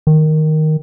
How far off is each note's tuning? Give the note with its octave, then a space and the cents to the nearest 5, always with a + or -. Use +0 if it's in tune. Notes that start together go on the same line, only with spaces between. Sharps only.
D#3 +0